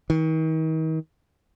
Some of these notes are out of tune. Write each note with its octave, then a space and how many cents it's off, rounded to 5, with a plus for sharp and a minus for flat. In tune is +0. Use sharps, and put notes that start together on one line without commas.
D#3 +40